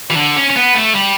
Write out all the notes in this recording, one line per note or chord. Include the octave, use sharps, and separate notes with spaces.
E3
D3
C#4
C#4
B3
A3
G3